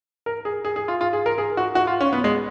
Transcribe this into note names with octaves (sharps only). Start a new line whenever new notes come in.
A#4
G#4
G#4
G#4
F4
F4
G#4
A#4
G#4
F#4
F#4
F4
C#4
B3
G#3